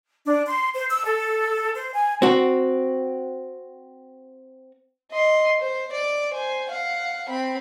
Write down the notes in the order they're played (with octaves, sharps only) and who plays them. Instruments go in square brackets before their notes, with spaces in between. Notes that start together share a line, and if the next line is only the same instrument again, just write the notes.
[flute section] D4
C6
C5
E6
A4
C5
G#5
[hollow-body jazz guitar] C4 F#4
[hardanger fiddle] D#5 C6
C5
D5
C5 G#5
F5 F#5
C4 B5